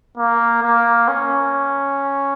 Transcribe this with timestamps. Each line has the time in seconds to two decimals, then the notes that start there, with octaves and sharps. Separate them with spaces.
0.17 A#3
0.63 A#3
1.08 C#4